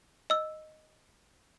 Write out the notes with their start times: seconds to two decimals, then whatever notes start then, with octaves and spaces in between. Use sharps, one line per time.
0.30 D#5 E6